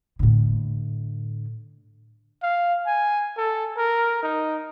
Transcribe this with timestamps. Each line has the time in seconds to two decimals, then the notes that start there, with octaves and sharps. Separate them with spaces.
0.19 A2 D3
2.43 F5
2.86 G#5
3.37 A4
3.78 A#4
4.23 D#4